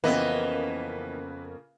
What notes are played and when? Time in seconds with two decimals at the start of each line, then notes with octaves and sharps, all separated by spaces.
0.04 F2 C#3 E3 A#3 B3 B4 D#5